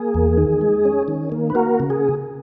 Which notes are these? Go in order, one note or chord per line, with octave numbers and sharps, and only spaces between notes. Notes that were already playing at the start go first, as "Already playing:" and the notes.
Already playing: A#3 G#4
E2
D#3
G#3
C#4
D#3
A#3
B4
A#3 F#4 A#4
C#3
G#4